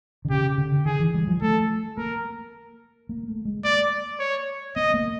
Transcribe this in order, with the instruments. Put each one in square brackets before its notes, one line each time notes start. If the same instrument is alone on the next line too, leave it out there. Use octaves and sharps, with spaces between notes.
[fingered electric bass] D3
[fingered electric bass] C#3 [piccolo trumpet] G4
[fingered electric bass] D3
[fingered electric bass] D#3 [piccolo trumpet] G#4
[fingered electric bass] E3
G3
F3
[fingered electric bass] A3 [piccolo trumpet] A4
[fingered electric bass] A#3 [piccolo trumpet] A#4
[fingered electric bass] A#3
A3
G#3
[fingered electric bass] A#3 [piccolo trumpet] D5
[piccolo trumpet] C#5
[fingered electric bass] B3 [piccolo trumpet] D#5
[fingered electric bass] A#3